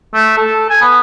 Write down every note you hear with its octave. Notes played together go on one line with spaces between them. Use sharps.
A3
A4
G#5
B3